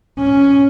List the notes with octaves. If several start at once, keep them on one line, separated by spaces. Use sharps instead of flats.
C#4